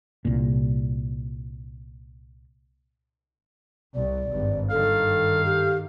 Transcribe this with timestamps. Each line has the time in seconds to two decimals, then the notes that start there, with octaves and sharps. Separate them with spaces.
0.25 C2 A#2
3.95 C2 D5
4.30 G#1 G2
4.71 G2 D#3 A4 F5
5.45 G4